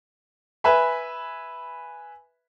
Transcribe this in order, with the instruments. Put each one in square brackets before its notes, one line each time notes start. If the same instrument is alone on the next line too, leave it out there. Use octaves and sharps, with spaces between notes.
[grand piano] B4 E5 G#5 B5